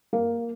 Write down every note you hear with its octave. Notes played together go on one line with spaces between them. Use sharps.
A#3